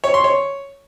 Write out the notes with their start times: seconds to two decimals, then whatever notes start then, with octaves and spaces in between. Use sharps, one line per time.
0.04 C#5
0.14 C6
0.24 C#5